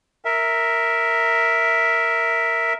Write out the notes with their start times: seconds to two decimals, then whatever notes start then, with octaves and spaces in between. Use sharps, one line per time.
0.25 A#4 E5